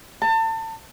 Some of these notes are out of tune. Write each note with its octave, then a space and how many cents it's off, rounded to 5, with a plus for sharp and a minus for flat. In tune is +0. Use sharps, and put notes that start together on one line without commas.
A5 +30